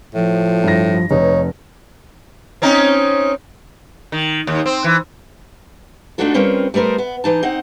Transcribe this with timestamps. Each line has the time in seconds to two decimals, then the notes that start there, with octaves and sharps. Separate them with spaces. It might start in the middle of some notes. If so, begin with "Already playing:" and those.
0.15 A2 F3
0.64 G2 A#6
1.11 F1 D#4 B4 C#5
2.62 C4 C#4 D#4
4.12 D#3
4.47 D#2
4.66 C4
4.84 E3
6.18 A3 D4 D#4 F4 F#4 A4
6.34 G3 C4 C#4 F4 A#4 B4
6.74 G3 A3 B3 A#4 C5
6.98 B3
7.24 E3 D#4 A5
7.43 C4 D#4 D#5 F#5